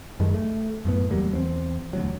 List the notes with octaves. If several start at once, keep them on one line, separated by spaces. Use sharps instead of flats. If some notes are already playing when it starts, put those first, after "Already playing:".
F#2 D#3 G#3
A3
F#2 A2 B3
E2 F#3 G3 A#3
E2 B3 C4
E1 D2 F#3